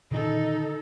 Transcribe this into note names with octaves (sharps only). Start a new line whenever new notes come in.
A#2 D3 D#3 D#4 A4